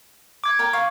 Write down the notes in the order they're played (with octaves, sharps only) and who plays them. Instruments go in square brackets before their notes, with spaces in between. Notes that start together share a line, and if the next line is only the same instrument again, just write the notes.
[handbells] D6 G#6
[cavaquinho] A#4 G5
[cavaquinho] F5 [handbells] C#6